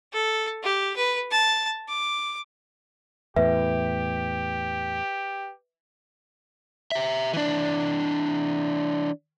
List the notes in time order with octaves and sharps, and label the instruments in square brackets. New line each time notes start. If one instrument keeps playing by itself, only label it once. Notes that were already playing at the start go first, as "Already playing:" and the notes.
[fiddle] A4
G4
B4
A5
D6
[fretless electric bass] E2 A2 [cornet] G4 [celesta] B4 [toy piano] E5
[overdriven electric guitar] G4 E5
E3 D4